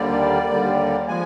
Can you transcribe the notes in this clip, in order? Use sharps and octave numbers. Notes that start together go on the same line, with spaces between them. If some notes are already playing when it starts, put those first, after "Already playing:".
Already playing: D#2 D3 G3 A#3 D5
D#2 D3 G3 A#3
F3 G#3 G#5